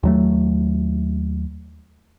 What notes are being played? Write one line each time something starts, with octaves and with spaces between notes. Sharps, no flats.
D#2 F#3 A3